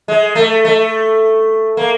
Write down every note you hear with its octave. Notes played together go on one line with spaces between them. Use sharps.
G#3
A3
A3
A#3